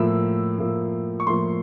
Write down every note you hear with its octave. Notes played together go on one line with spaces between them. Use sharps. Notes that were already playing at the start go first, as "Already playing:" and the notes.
Already playing: A2 F3 A#3 E6
A2 F3 A#3
C#6
A2 F3 A#3 C6